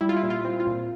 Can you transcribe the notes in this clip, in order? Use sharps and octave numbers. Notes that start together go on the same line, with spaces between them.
G3 E4
F4
E4
A#2
F4
C4
F4
A#2